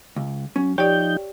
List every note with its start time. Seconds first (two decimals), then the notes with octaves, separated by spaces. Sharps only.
0.16 C#2
0.56 F#3 C#4
0.78 F3 D#4 G4 C#5 D5 G5 G6